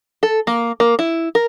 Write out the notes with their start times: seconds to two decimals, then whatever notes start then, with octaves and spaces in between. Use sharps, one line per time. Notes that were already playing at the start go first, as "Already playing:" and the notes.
0.23 A4
0.47 A#3
0.80 A#3
0.99 E4
1.35 A#4